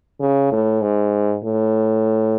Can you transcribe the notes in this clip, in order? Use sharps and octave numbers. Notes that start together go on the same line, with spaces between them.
C#3
A2
G#2
A2